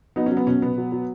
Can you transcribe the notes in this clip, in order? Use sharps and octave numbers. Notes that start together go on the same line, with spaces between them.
F#3 B3 D#4
C#4
F#3
B3
B2 C#4
B2 B3
F#3
F#3